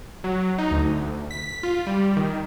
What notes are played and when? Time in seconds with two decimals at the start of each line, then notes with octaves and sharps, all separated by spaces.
0.24 F#3
0.58 D#4
0.71 D2
1.31 B6
1.63 F4
1.86 G3
2.16 D#3